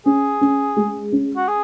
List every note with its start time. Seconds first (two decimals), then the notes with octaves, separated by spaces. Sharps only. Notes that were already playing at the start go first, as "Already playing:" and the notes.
0.06 C#4 G#4
0.41 C#4
0.76 G#3
1.12 C#4
1.36 F#4
1.48 G#4